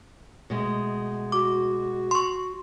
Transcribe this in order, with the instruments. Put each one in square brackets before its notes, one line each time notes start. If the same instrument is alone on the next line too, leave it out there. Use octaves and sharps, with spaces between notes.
[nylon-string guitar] B2 G#3 A3
[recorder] F#4 [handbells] D6
[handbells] C6 C#6